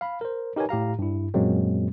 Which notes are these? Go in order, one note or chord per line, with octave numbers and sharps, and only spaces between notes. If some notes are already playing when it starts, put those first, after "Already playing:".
F5 B5
A#4 C5
D#4 G4 A#4 B4 C#5 G#5
A2 G4 F5 A#5
G2 E4
F#2 A#2 F#3 G#3 A#3 C4